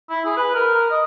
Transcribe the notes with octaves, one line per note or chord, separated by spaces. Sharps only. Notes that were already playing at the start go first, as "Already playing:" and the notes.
E4
G#4
B4
A#4
A#4
D#5